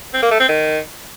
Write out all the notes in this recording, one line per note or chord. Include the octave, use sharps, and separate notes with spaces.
C4
A#3
A3
C4
D#3